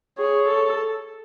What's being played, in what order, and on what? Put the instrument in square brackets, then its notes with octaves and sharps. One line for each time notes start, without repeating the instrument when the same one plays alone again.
[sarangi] G#4 [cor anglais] C#5
[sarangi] A4